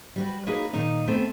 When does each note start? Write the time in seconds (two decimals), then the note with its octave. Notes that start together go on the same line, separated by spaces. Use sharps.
0.16 G3 F#4 B4
0.47 A#3 C#4 D#4 F#4 G#4 B4
0.73 A#2 D#3 D#4 D#5 A#5
1.07 A3 B3 C4 A4 G#5